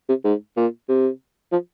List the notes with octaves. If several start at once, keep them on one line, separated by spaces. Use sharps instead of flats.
C3
G#2
A#2
C3
F3